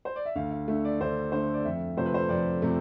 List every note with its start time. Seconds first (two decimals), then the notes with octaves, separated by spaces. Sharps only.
0.05 C5
0.16 D5
0.25 E5
0.36 D2 F5
0.51 F5
0.67 D3 A3 E5
0.85 D5
1.01 D2 C5
1.32 D3 A3 C5
1.54 D5
1.65 F2 E5
1.97 C3 F3 A3 C5
2.06 B4
2.14 C5
2.29 F2 D5
2.62 C3 F3 A3